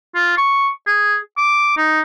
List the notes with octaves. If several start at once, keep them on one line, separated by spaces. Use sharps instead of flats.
F4
C#6
G#4
D6
D#4